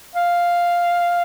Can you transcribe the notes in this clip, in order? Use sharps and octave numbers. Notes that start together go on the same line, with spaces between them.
F5